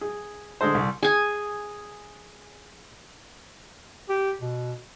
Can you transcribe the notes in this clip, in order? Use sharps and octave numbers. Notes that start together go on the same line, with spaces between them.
G#4
D3 G#3 A4 C5
C2
G#4 G#5
G4
B2